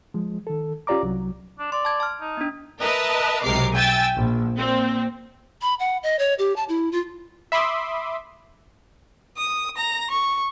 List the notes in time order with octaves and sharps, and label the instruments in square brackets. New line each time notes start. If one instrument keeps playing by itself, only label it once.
[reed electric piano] F3 G#3
D#3 A4
C#4 F4 G4 D5 A#5 D6
C2 F#3
[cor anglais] D4
[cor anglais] D5 [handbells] C6
[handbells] A5 G#6
A5 F6
[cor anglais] D#4
[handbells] B3 D4
[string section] A#4 B4 D#5 E5 A5
B1 G#2 C3 A#4 D6 C7
E5 G5 G#5 E6 A6
A#1
A#2 C4
[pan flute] B5
F#5
D#5
C#5
G4
A5
E4
F4
[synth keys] E5 B5 C6 D6 D#6
[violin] D#6
A#5 A#6
C#6